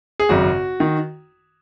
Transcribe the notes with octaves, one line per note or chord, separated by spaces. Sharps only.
G#4
G#1 F#2 C#3 F#4
D#3